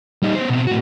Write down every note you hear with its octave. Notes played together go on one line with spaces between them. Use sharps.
G3 D#4
B3 C5
B2 C4
A2 F#4